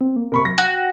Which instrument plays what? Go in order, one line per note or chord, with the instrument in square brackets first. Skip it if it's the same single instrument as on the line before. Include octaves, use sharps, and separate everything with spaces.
[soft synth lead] C4
A#3
[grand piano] C3 B5 C#6 [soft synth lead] A#4
[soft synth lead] F#3 [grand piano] A#6
[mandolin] F#4 [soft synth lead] G5